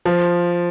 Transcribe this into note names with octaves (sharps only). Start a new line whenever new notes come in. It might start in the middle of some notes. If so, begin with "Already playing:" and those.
F3